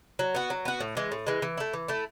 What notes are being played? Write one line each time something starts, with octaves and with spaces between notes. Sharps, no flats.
F#3
B3 F#4
F#3
B3 F#4
A2
E3 G#3
A2
E3 G#3
E3
A3 E4
E3
A3 E4